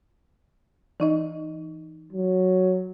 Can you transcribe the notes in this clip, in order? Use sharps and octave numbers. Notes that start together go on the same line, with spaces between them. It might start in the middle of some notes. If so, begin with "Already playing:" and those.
E3 D#4 D#5
F#3